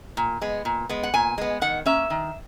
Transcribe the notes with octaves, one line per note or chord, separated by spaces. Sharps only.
A#2
G#3 B3
A#2
G#3 B3
F#5
A#2 G#5
G#3 B3
D#3 F#5
A#3 C#4 E5
D#3